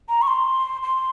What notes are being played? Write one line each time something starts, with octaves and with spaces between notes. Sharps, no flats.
A#5
C#6
C6
C6